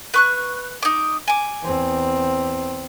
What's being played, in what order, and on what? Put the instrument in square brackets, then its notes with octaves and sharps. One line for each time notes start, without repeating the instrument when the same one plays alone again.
[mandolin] B4 C#6 F#6
D#4 D6
G#5 D6
[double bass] E2 C4